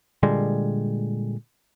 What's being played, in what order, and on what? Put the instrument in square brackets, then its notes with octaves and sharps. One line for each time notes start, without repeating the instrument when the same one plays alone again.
[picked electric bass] A#2 D3 G3 G#3